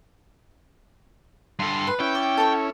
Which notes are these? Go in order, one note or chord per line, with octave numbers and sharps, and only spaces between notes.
G2 A4 C6
B4
C#4 E4 G5
D5
A4 C#5 C#6